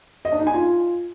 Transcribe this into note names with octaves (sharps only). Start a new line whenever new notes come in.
D#5
D4
D#4
G#5
F4